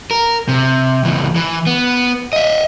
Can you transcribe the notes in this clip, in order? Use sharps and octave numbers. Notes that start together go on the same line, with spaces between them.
A#4
C3
C#2 E3
E3
B3
D#5 E5